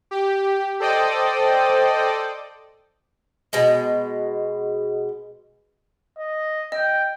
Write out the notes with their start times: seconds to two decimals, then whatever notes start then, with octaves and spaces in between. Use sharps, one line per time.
0.11 G4
0.80 A4 C5 D5 D#5 G5 D#6
3.53 B2 G#3
6.18 D#5
6.72 D#5 G5